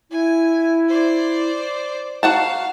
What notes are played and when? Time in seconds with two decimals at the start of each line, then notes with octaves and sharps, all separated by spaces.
0.11 E4 G#5
0.89 C5 D5
2.23 F#4 F5 F#5 A5 A#5